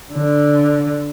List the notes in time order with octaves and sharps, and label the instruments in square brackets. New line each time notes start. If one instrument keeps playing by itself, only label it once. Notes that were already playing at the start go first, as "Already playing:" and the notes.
[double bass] D3